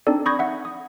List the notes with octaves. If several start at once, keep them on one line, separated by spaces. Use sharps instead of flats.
C4 D4 D#4 A4 D5
B5 C#6 D#6 G6 G#6 A#6
E5 F#5
D#6